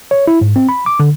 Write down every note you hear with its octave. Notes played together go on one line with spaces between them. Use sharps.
C#5
E4
G#2
C4
B5
D6
D3